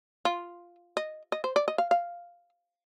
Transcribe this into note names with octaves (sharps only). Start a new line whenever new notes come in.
F4
D#5
D#5
C5
D5
D#5
F5
F5